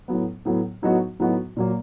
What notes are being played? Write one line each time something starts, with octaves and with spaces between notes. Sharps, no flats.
A2 F#3 B3
A2 F#3 B3
A2 F#3 B3 D#4 F#4
A2 F#3 B3 D#4 F#4
A#2 F#3 A#3